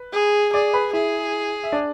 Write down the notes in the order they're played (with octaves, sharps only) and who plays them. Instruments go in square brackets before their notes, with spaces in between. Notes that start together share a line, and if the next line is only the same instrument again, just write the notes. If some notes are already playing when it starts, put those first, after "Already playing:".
Already playing: [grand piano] B4
[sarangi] G#4
[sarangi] G#4 [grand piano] D5 D6
[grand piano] B4 B5
[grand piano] E4 E5 [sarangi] G#4
[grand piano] E5
D4 D5